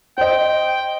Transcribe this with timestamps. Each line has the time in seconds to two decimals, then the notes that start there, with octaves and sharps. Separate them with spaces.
0.18 C5 D#5 G5